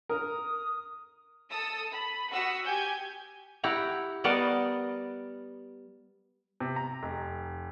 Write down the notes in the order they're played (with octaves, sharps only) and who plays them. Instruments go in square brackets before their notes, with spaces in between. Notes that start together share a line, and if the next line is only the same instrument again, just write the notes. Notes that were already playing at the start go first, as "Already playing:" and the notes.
[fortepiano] A#4 [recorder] D#6
[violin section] A4 A5 D#6 E6
B5
F#4 F#5 D#6 E6 B6
G4 G#5 G6 G#6
[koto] E4 G4 F#5 A#5
G3 B3 A#4 D5 D#5 F#5
[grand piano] C3
A#5
F1